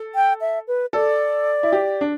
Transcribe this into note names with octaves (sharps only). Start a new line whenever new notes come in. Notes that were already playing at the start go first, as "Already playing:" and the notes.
Already playing: A4
G5
E5
B4
A4 D5
E4
G4
D4